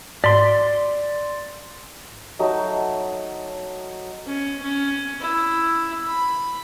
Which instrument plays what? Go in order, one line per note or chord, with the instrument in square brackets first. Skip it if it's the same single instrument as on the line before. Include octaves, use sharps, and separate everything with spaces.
[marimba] G#2 [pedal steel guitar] D5 C6
[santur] F#3 A3 D#4 F#4
[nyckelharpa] C#4
C#4
E4
B5